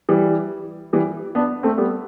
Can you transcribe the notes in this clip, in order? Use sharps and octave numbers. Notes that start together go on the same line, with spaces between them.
E3 G3
E3 G3
B3 D4
A3 C4
G3 B3